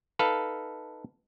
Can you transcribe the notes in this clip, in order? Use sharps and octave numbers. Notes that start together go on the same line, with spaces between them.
D#4 A4 B4 F5